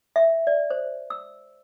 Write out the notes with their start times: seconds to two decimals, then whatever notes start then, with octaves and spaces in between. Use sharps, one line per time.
0.16 E5
0.47 D5
0.70 C5
1.10 E6